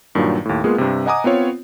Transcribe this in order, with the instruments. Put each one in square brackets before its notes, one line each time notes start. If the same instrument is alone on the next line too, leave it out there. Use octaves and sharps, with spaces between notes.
[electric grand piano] G2 A#2 D#3 F#3
D#2 A2
G#3 A#3 B3 F4 G#4
G2 C3
D#5 F#5 G#5 A#5 D6 D#6
B3 C4 F4 C#5